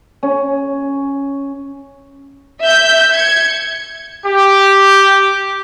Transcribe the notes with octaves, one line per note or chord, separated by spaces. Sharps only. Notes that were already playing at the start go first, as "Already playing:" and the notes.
C#4
E5 G6
G#6 C#7
G4